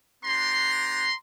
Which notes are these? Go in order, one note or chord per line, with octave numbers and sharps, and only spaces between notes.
B3 D4 G4 A#5 C6